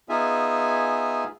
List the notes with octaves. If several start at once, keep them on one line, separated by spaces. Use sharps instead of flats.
B3 D#4 F4 G#4 E5 G#5